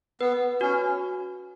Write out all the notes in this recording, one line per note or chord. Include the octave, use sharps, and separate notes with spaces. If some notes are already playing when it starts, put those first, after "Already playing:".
B3 B4
C#4 F#4